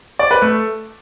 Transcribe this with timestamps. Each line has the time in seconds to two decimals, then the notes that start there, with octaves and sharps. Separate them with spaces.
0.19 D5
0.31 B4
0.42 A3